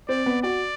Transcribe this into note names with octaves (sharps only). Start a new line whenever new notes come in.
C4 D5
B3
F#4 D5